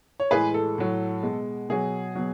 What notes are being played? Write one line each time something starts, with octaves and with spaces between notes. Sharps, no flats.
C#5
A2 E3 G#3 G#4 B4
A4
A2 F#3
B2 G#3
B2 F#3 G#4
B2 F#3